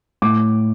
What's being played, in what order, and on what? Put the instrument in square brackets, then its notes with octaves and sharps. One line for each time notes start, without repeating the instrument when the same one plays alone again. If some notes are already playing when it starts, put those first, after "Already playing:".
[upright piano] A2 D6